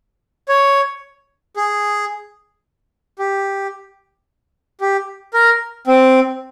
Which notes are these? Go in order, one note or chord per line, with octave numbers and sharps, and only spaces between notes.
C#5
G#4
G4
G4
A#4
C4